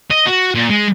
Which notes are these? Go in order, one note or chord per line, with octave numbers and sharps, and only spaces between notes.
D#5
F#4
A#2
G#3